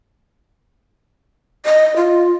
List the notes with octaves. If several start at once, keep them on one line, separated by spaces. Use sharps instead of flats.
D#5
F4